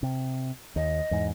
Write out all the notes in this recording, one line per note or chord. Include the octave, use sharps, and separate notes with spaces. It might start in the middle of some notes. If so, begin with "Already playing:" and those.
C3
D#2 D#5
E2 G#2